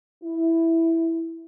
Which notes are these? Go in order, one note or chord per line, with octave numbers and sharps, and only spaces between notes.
E4